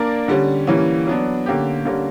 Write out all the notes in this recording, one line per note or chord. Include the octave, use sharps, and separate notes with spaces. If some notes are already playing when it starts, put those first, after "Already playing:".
Already playing: A#3 D4 A#4 D5
D3 G3 C#4
E3 G3 A#3 C#4
F#3 B3 D4
D3 A#3 C#4 G4
D3 G3 A#3 C#4